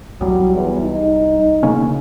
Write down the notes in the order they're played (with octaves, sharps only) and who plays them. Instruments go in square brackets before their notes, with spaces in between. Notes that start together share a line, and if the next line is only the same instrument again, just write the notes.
[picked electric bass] C2 G3 [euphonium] F#3
[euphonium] E2
D#4
[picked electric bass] C#3 A#3 C#4